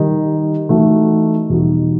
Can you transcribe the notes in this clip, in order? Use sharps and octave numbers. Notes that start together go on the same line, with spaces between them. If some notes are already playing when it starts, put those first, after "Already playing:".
Already playing: D#3 G3 D#4
E3 A3 D#4 F#4
E2 B2 G3 D#4 F#4